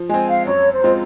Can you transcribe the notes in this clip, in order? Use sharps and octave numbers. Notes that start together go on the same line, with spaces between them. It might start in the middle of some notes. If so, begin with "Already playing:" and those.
Already playing: F3
G#3 C4 G#5
F5
F#2 C#5
C5
F3 G#3 C4 F4